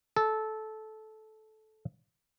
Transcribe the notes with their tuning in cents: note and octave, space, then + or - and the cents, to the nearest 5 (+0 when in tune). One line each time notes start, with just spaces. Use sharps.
A4 -15